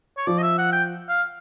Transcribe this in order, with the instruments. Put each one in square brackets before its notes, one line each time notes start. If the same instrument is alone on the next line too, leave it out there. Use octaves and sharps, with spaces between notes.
[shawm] C#5
[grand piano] F3 [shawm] D5
[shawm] D#5
E5
F#5
G5
F5